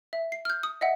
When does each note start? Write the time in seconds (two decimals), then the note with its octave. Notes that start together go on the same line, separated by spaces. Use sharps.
0.13 E5
0.32 C7
0.45 F6 G6
0.63 D#6
0.81 D#5 E5 F#5